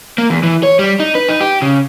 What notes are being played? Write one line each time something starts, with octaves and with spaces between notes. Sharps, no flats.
A#3
E2
E3
C#5
G3
D#4
B4
D#4
G4
C#3